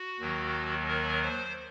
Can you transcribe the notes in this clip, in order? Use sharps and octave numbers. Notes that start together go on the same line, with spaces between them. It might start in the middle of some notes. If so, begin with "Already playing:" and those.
Already playing: F#4
D#2 D#3 F#3
A#4
C5